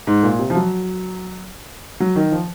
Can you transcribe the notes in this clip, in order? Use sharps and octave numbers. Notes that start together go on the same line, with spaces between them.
G#2
A#2
C3
F3
F#3
F#3
D#3
F3